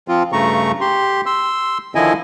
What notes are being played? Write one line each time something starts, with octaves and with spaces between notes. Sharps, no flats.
F3 C4 F4
G2 C#3 A3 A#5 C#6
G4 C6
C6 E6
D3 D#3 F3 E4 D#5 G#5